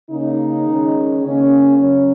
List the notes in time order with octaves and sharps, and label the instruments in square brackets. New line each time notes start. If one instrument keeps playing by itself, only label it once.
[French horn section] C#3 A#3 C#4 D#4
D#3 G#3 C#4
C#3 A#3 C#4
C#3 F#3 C#4